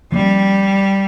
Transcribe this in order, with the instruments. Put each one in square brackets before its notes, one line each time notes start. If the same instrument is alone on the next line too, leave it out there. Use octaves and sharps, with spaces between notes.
[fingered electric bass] F3 A#3 C#4 [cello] G3